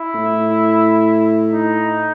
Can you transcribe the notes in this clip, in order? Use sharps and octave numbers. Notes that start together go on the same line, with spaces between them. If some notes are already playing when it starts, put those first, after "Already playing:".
Already playing: E4
A2
D#4